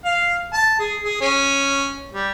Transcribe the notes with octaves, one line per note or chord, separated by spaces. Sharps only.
F5
A5
G#4
G#4
C#4
G3